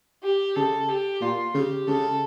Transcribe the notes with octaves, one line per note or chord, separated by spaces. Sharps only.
G4
C#3 A4
G4
A#2 F4
C#3 G4
C#3 A4